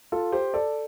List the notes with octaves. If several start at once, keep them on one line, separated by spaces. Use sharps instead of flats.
F4 A4
G4 C5
A4 D5